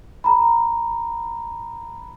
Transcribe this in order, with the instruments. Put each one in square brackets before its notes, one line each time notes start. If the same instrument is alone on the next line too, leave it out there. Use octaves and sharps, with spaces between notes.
[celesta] A#5 B5